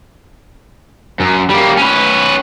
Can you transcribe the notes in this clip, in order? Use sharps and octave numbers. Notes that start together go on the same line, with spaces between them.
F#2
G3 A#3
C#4 B4